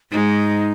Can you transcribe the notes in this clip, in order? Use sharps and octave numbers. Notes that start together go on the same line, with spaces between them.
G#2 G#3 D#4